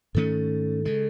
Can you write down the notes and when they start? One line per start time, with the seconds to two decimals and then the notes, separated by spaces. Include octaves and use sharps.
0.15 G#2 D#3 A3 C#4 A4
0.85 C#3 G#3 A4